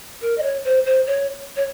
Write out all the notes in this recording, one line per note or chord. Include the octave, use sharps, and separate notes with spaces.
A#4
D#5
C#5
C5
C5
C#5
C#5